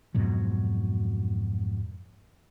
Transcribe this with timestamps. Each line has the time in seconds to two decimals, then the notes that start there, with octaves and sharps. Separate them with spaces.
0.14 F2 G#2 B2 F#3